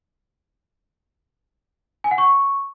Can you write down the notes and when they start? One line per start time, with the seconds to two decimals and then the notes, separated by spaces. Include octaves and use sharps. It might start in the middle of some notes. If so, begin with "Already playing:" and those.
2.04 G#5
2.11 F#5
2.18 C#6